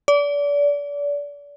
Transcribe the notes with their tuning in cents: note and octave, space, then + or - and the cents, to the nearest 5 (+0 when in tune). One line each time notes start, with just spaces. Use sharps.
D5 -30